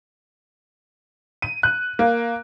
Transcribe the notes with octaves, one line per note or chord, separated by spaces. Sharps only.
D#7
F#6
A#3